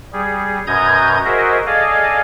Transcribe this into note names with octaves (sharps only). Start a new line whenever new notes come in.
G3 G#4
F#2 B2 A#5 D#6 G6 G#6
F#4 G#4 A#4 C5 D#5 E5
G#4 A4 D5 D#5 F5 G#5